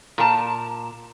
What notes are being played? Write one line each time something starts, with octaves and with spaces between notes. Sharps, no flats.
A#2 A#4 A5